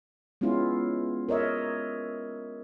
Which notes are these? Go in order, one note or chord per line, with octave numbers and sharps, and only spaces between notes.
G#3 B3 C#4 E4 F4
A#4 C#5 D#5 E5